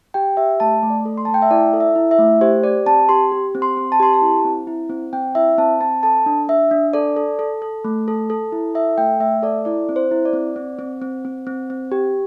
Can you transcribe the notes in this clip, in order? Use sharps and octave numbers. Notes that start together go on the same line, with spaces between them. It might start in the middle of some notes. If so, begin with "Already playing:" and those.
G4 G5
G4 E5
A3 A5
A3
D5
A4
C6
A3 A5
G5
E5
E4 D5
A4
E5
E4
E5
A3
G4 C5
G4 D5
C4 A5
G4 C6
G4
C4
C6
C4
A5
G4 C6
A5
E4
C4
E4
C4
C4 G5
E4 E5
C4 A5
C4 A5
A4 A5
D4
D4 E5
D4
A4 D5
A4
A4
A4
A3
A4
A4
E4
A4 E5
A3 G5
A3 E5
A4 D5
E4 D5
C4
C5
E4
D5
C4
C4
C4
C4
C4
C4
C4
G4